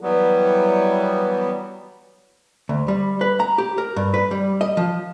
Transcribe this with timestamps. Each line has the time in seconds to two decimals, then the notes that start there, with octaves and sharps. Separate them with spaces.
0.01 E3 F#3 G3 B3
2.69 D2
2.88 G3
3.21 B4
3.40 A#5
3.58 G4
3.78 A#4
3.96 G2
4.14 B4
4.31 G3
4.61 D#5
4.77 F3